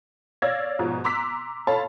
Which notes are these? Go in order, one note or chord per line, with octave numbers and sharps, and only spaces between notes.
C#5 D5 F5 E6 G#6 A#6
G#2 B2 F3
A#5 C6 D6 E6 F#6 B6
A4 C#5 F5 A5 B5 C6